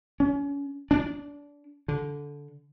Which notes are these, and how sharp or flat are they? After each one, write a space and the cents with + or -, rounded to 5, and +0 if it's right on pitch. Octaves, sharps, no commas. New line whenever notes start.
C#4 +30
D4 -25
D3 -15